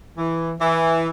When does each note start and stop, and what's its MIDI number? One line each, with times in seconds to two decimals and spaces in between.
0.17 0.52 52
0.60 1.09 52